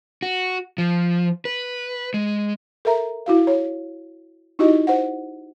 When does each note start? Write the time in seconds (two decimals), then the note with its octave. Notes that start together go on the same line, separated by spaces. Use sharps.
0.22 F#4
0.78 F3
1.45 B4
2.14 G#3
2.85 A4 A#4 E5 A#5
3.26 E4 F#4 F5
3.47 C#5
4.59 D#4 E4 F#4 G4 D#5
4.87 C5 F#5